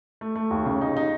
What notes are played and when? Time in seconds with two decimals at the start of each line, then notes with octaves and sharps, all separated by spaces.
0.21 A3
0.36 A3
0.50 D#2
0.66 C#3
0.81 D#4
0.97 D#4